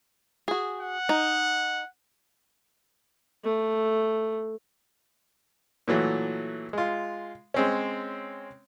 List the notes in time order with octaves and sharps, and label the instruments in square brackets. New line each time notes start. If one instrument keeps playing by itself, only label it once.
[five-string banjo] F#4 G#4
[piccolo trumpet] F#5
[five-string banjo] D#4
[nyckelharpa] A3
[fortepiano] A#2 E3 F#3 A3
G#3 F4
G#3 C4 C#4